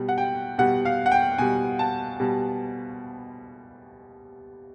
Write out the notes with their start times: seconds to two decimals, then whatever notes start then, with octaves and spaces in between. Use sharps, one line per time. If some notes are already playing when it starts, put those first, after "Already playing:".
Already playing: B2 G3
0.09 F#5
0.18 G5
0.58 B2 G3 F#5
0.85 F5
1.06 F#5
1.12 G5
1.38 B2 G3 G#5
1.79 A5
2.20 B2 G3